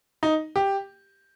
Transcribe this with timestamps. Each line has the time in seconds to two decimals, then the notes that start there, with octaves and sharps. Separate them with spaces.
0.23 D#4
0.56 G4